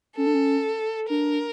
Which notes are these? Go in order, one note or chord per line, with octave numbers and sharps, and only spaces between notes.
C#4 A4
D4
C#4
D4 A#4